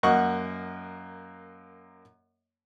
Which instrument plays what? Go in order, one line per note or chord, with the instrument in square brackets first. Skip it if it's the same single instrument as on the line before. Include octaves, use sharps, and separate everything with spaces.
[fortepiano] F#2 A#3 D#5 F#5 C#6 F#6